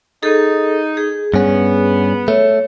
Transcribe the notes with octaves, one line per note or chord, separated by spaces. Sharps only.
D#4 G#4 A4
G#4
G2 B3 C#4
A3 C#5